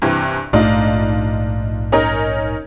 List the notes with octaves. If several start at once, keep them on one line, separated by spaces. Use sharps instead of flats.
G2 C3 E3
A#1 G#2 A3 D4 D#4 F4
C#4 D#4 A#4